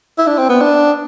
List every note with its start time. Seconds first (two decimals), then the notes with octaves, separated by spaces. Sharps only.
0.18 E4
0.27 D4
0.38 C4
0.49 B3
0.61 D4